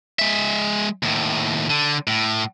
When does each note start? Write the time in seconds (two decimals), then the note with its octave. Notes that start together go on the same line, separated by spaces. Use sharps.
0.19 G#3 E5
1.03 D#2 A2
1.70 D3
2.07 A2